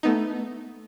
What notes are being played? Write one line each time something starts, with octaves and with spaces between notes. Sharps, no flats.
A3 B3 D#4